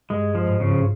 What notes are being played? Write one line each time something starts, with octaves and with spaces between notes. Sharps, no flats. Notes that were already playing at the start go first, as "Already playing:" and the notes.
G2 G#3
F3
G#2
C#3